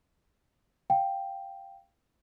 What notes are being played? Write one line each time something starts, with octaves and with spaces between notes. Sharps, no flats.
F5 G5